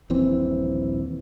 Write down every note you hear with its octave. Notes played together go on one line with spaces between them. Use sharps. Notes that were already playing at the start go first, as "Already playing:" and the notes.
D#1 A#1 E3 C4